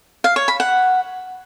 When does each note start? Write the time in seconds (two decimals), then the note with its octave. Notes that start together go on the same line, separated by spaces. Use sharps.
0.24 F5
0.36 C#5
0.48 B5
0.60 F#5